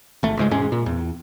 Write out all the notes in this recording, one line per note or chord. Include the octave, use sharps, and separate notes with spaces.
G#1 A3
C#2 G#2 G#3
E1 G#2 G#3 C#4
A#2
E2